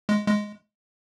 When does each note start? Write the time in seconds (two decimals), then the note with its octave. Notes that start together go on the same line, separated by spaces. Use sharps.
0.09 G#3
0.28 G#3